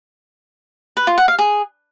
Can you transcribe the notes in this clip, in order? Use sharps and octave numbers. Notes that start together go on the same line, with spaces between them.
B4
F4
F#5
F5
G#4